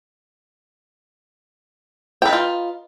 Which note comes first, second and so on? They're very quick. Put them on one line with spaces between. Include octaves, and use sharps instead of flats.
G5 B4 D#4 F4